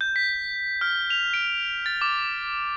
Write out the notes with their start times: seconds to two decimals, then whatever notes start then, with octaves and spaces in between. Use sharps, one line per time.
0.01 G6
0.16 B6
0.81 F6
1.10 F7
1.34 D7
1.86 A6
2.01 D6